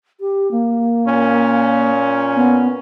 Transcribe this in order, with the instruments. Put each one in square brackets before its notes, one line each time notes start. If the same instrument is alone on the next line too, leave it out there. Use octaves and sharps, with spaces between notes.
[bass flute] G4
A#3
[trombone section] A#2 C#4
[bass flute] B3